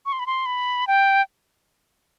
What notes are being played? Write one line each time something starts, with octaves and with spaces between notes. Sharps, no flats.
C#6
C6
B5
C6
B5
G5